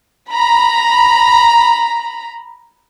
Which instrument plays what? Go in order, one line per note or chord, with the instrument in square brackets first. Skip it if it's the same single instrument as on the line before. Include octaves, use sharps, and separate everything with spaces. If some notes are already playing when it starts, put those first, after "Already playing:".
[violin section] A#5 B5